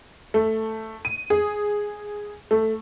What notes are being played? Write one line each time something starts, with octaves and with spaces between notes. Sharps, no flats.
A3
D#7
G#4
A3